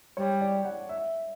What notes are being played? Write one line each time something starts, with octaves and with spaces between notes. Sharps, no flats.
G3 C#5
D5
F#5
E5